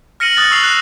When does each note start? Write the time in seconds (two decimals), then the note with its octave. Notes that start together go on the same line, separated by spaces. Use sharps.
0.20 F6 A#6 C#7 D#7 F#7
0.37 D#6 F#6 A6
0.51 C#6 E6 C7 F7
0.63 F#6 C7